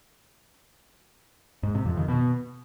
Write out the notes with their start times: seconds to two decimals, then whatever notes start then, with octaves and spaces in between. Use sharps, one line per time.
1.63 G#2
1.75 C3
1.86 F2
1.97 D#3
2.08 B2